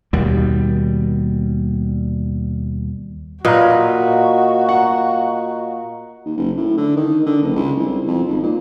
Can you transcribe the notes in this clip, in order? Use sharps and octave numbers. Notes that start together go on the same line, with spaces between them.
D#2 B2 G3
A#2 F#4 B4 D#5 F5 A#5
F#5
D#2
F#1
A2
D3
D#3
D3
F#1
C#2
C2
F2
G#1
A#2